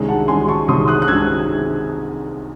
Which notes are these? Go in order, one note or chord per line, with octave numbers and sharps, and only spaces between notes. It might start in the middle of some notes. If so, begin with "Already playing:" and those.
Already playing: C2 C3 D#3 G#3 C#4
F#5 A5
C2 C3 D#3 G#3 C#4 G#5 C6
A5 C#6
C2 C3 D#3 G#3 C#4 C6 D#6
D#6 F#6
F#6
C2 C3 D#3 G#3 C#4 E6 G#6